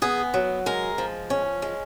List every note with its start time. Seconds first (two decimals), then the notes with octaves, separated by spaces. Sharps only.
0.02 B3 G#4
0.34 F#3
0.66 G#3 A#4
0.98 F3
1.30 C#4
1.62 G#3